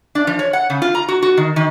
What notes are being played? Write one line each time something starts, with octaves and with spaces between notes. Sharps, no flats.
D4
F3
C#5
F#5
C#3
F4
A#5
F#4
F#4
D#3
D#3